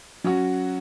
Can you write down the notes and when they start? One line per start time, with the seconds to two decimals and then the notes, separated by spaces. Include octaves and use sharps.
0.24 F#3 C#4 F#4